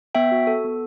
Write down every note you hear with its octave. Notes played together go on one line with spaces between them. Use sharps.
B3 E5 G5
F#4
A4
B3